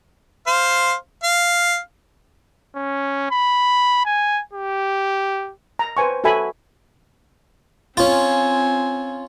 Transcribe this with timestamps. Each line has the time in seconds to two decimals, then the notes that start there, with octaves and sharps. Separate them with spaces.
0.47 C5 F5
1.24 F5
2.76 C#4
3.31 B5
4.05 G#5
4.53 G4
5.79 A#5
5.97 B4 C5 G#5 C#6
6.24 F#4 A4 E5 G#5 B5
7.97 C4 C#4 F4 G#5